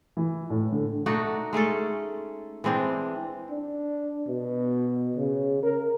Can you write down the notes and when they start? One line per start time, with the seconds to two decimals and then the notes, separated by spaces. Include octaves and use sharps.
0.17 E3
0.50 A2
0.72 D3
1.06 A3 D4 D#4 F#4
1.53 G#3 A3 C#4 A4
2.64 E3 G#3 C4 D4
3.50 D4
4.28 B2
5.16 C#3
5.63 A#4